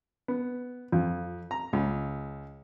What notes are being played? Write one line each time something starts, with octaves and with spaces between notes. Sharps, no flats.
B3
F2
A#5
C#2